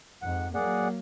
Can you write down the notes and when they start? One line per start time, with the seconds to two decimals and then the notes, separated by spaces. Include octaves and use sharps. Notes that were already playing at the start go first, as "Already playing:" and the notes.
0.22 F2 G#2 F#5
0.55 F#3 A#3 G#4 D5 F#5